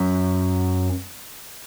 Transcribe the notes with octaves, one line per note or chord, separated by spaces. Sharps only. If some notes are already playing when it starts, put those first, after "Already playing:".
Already playing: F#2